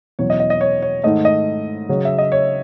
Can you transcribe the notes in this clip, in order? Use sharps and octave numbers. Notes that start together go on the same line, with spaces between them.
E2 B2 F#3 C#4 C#5
D#5
D#5
D#5
C#5
C#5
G#2 D#3 A3 D#5
D#5
C#3 F#3 C#4
E5
D#5
C#5